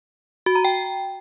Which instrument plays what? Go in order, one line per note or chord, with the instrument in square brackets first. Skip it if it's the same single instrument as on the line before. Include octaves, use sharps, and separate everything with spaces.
[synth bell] F#4
A#5
G5